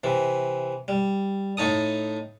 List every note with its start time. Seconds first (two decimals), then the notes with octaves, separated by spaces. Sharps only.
0.04 C3 E3
0.88 G3
1.57 A2 D#4 A4 D#6